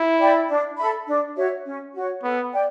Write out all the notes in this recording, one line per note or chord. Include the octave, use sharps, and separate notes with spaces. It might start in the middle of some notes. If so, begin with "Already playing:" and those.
Already playing: E4
D5 G5 B5
D4
A4 E5 B5
D4
F#4 C#5 E5
C#4
F#4 C#5
B3 A4
D5 G5